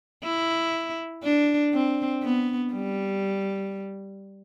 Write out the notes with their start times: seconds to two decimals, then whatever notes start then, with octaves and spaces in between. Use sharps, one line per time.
0.24 E4
1.24 D4
1.73 C4
2.23 B3
2.73 G3